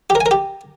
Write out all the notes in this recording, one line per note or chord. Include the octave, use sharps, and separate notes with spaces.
G4
A#4
G#5
A#4
G4